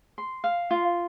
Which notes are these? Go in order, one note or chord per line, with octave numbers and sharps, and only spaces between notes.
C6
F5
F4